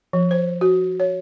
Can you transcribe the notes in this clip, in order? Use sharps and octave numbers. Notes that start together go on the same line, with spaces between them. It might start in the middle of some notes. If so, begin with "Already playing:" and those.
F3
C5
F#4
C#5